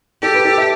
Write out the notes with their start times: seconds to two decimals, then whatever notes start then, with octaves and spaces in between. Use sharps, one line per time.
0.22 G4 A4
0.35 B4
0.45 A4
0.58 E5